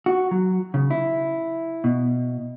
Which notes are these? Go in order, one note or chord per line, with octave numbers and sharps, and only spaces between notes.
F#4
F#3
C#3
E4
B2